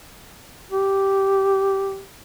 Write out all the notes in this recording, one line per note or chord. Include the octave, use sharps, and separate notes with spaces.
G4